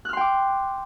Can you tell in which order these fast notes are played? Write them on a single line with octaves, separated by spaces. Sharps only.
F#6 F6 C6 G5 D6